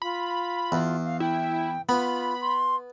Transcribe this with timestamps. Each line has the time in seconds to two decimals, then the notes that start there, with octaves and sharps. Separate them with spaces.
0.02 F4 B5
0.72 E2
1.05 F5
1.20 E4 G5
1.89 B3 F4 B5
2.41 C6